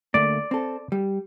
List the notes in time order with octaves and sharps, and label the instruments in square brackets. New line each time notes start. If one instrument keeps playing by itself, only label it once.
[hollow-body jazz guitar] D2 A3 A#3 [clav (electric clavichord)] D5
[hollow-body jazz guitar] C4 A4
G3